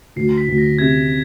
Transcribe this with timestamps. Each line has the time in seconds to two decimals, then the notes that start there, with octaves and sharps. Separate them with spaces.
0.16 D2 C7
0.38 B6
0.48 D2
0.58 A#6
0.79 C3 G#6